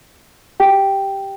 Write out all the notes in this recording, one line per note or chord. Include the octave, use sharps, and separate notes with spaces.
G4 G5